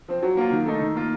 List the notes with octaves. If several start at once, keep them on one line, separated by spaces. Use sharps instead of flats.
F3 C4
F#3
A#3 F4
D#3
A3 D#4 A4
D#3
A#3 F4